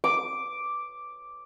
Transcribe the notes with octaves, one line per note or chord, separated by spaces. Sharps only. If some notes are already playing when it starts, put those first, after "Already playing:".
D6